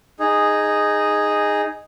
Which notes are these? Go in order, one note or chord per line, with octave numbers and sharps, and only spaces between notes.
D#4 G#4